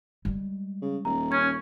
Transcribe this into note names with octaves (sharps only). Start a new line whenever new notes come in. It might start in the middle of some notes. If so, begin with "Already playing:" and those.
G3 G#3
C#3
D#1 A#5
C#4 G#6